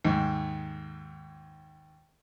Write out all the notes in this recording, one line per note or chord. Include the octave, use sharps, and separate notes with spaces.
D#2 G#2